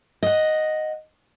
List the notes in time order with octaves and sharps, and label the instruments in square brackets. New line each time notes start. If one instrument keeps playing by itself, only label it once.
[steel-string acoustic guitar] D#5 F#5